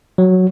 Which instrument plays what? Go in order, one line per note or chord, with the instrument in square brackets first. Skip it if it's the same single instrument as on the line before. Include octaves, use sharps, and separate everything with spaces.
[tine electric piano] F#3